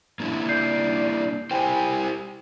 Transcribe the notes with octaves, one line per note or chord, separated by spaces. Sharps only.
A#3 D4 E4
D5 G6 C7
E4 G4 C5 G5 G#5